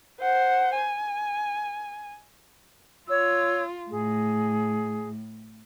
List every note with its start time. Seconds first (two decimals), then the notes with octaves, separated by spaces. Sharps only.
0.20 C5 F#5
0.75 G#5
3.10 F4 C#5 E6
3.91 A2 G#4